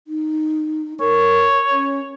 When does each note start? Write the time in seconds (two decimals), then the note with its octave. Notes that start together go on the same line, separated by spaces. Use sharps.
0.08 D#4
1.00 A#4 C#5
1.71 C#4